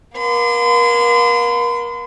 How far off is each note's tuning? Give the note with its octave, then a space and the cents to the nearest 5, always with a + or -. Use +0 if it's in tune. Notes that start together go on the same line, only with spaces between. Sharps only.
A#3 +35 C6 -40